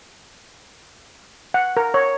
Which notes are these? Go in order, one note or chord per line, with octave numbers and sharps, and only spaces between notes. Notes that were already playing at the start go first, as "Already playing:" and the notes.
F#5
A#4
C#5